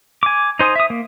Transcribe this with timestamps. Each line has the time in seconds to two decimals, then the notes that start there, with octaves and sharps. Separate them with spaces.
0.23 G#5 D6
0.59 D#4 C5 G#5 D#6
0.76 E5 D#6
0.90 A#3